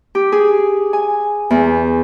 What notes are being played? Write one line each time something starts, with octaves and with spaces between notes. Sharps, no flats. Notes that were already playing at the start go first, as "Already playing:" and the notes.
G4
G#4
G#5
E2